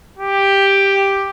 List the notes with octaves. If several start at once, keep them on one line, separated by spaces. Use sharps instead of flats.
G4